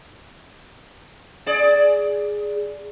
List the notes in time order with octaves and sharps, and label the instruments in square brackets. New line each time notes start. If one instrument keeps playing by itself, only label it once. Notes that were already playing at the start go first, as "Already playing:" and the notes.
[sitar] G#4 D5